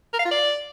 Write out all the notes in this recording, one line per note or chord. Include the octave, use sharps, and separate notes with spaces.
A#4
F5
F4
D5